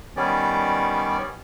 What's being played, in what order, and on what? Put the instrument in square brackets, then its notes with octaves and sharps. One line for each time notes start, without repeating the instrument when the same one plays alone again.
[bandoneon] D#3 G3 B3 C#4 D5